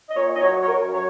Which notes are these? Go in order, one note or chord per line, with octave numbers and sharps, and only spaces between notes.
D#5
A#2 C#5
D#5
F#3 C#5
C#5
F#2 A#4
F#3 C#5